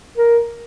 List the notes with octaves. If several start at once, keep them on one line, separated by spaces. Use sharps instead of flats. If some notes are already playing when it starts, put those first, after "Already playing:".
A#4